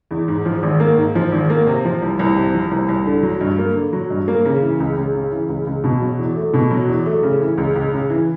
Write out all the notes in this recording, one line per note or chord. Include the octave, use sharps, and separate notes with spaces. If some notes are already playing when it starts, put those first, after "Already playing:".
E2
G#2
F3
G#1
A#3
G#2
F3
G#1
A#3
C3
F3
C2
C2
C3
F3
C2
C2
D3
F#3
G2
A#3
D3
F#3
G2
A#3
C#3
E3
C#2
C#2
C#3
E3
C#2
C#2
B2
F#3
E2
A3
B2
F#3
E2
A3
C#3
E3
C#2
C#2
C#3
E3